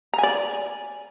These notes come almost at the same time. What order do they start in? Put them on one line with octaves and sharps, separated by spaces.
A#5 G#5 D5